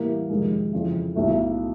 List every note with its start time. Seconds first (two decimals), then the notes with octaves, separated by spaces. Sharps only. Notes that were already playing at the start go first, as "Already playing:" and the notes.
Already playing: A2 E3 G3 A#3
0.30 F2 C3 D#3 G#3
0.73 F2 C#3 E3
1.16 B1 A2 F#3 A3